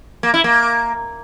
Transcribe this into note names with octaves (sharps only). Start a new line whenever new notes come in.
A#3
E4
A#3